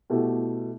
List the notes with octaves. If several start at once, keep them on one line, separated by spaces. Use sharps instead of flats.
B2 A3 E4 G4